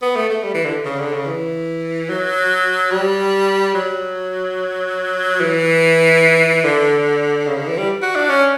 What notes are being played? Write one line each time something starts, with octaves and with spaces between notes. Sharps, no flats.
B3
A3
A3
G3
E3
D3
C#3
D3
C#3
E3
F#3
G3
F#3
E3
D3
C#3
D3
E3
G3
F#4
D4
C#4